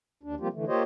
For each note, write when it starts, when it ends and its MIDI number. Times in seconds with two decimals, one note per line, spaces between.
0.23 0.35 39
0.23 0.35 62
0.40 0.48 53
0.40 0.48 55
0.40 0.48 58
0.40 0.48 60
0.40 0.48 65
0.40 0.48 67
0.53 0.65 50
0.53 0.65 52
0.53 0.65 57
0.68 0.83 58
0.68 0.83 65
0.68 0.83 67
0.68 0.83 72
0.68 0.83 73
0.68 0.83 75